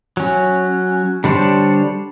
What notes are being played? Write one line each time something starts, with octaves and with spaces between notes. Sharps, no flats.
F#3 C#4
D3 G3 D4 C5 C#5